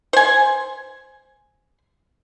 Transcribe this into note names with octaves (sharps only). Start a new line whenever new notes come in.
C5 G#5